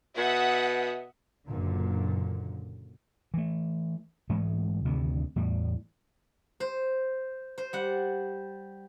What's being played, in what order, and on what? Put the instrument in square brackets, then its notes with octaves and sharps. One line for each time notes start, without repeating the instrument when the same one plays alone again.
[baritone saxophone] B2 [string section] E5 F#5 D#6
[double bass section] F#1 F#2 A#2 D3
[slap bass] E3 A3
G#2 E3 G#3 A3
D2 G2 C3 D#3
E2 A2 G3
[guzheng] C5
C5
G3 F#5